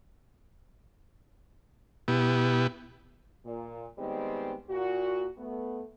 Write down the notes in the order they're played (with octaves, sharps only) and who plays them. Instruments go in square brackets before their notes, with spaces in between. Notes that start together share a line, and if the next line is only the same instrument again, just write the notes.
[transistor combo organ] B2 B3 E4 G4
[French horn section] A#2
D#3 G3 G#3 B3 C4
A#2 F#4
A3 B3